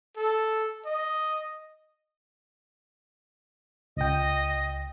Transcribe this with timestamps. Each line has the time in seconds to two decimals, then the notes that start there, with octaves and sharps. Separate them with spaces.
0.16 A4
0.85 D#5
3.97 C#2 D#5 G5